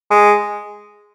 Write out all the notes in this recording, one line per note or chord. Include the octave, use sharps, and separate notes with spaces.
G#3